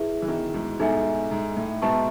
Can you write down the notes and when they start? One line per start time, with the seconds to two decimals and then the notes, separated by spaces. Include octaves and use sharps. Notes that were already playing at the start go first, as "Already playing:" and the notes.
Already playing: E4 G#4 B4 E5
0.22 E3
0.28 B2 D#3
0.53 G#2 B2
0.80 G#2 B2 D#4 A4 E5 G#5
1.31 G#2
1.56 A2
1.82 G#2 B2 B4 E5 A5 C#6